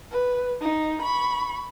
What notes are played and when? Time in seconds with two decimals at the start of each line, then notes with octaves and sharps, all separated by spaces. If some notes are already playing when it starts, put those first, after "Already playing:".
0.11 B4
0.61 D#4
1.02 B5 C#6